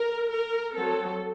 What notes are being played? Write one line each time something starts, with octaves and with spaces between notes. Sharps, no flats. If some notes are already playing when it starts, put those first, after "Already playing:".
Already playing: A#4
A#4
F#3 C4 A4